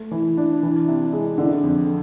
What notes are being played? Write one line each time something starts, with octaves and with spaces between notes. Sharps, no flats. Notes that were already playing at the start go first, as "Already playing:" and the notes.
Already playing: A3
E3
D4
E3
C3
G#3
D3
F2